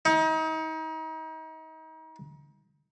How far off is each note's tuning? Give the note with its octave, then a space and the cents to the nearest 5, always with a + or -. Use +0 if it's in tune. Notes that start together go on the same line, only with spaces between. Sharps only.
D#4 +35